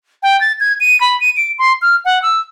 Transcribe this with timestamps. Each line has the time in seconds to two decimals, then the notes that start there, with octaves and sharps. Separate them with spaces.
0.23 G5
0.41 A6
0.60 G#6
0.80 D#7
1.01 B5
1.20 D#7
1.37 D7
1.59 C6
1.82 F6
2.05 F#5
2.22 E6